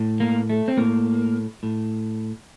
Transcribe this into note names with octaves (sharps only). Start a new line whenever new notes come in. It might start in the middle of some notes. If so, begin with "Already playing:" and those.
Already playing: A2
A#3
A3
C4
A2 A#3
A2